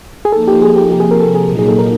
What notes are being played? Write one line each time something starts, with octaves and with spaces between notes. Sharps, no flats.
G#4
F3 A#3 D#4 A4
G4
G#4
G4
C3 F3 A#3 G4
G#4
A#4
A4
G#4
A#2 F#3 A#3 D#4
G#4
A4
A#4